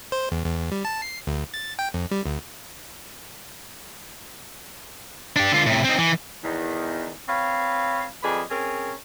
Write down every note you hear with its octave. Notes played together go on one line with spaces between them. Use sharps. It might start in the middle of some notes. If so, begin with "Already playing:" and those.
C5
E2
E2
G3
A5
C7
D2
A6
G5
F2
G3
D2
D4 G4
D3 F4
A2 C3
C4 D#4
E3
E2 D#3
C4 B4 C#5 F5
F2 G#4 B4 D5 D#5
C4 C#4 G#4 A#4